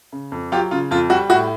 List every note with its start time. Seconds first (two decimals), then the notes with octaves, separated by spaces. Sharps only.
0.12 C#3
0.32 F2
0.52 F#3 F4 G4
0.71 C#3 F4
0.91 F2 F4
1.10 G3 F#4
1.30 A2 F#4